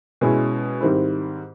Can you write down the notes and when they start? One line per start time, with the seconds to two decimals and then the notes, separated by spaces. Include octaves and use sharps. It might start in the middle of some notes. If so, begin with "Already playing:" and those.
0.21 B2 G#3 C#4 E4 G#4
0.80 G#2 D#3 G3 C4 E4